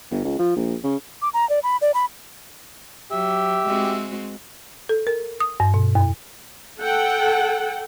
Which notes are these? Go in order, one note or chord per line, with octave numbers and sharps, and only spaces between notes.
G1
C#2
F3
A#1
C#3
D6
A#5
D5
B5
D5
B5
F#3 G4 E5
G#3 C4 F#4
A4
A#4
D#6
G2
B2
F#2
A4 F#5 G5